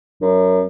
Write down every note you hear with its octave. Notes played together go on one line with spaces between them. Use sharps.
F#2